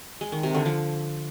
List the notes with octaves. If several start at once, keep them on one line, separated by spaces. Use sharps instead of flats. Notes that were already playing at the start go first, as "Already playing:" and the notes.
G#3
D#3
C3
D3
F3